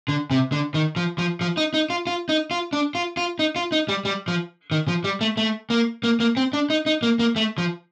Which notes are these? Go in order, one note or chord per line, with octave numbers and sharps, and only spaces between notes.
D3
C3
D3
D#3
F3
F3
F3
D#4
D#4
F4
F4
D#4
F4
D4
F4
F4
D#4
F4
D#4
G3
G3
F3
D#3
F3
G3
A3
A3
A#3
A#3
A#3
C4
D4
D#4
D#4
A#3
A#3
A3
F3